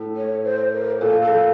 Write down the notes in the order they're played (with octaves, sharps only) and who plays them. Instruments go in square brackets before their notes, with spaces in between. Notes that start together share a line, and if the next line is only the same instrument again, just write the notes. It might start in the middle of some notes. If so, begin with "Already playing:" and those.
Already playing: [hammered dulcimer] A2
[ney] C#5
C5
A#4
[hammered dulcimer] A#2 [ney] A4
[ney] A4